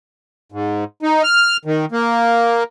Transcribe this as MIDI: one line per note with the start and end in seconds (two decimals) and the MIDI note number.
0.52 0.84 44
1.03 1.23 63
1.23 1.57 89
1.65 1.85 51
1.92 2.64 58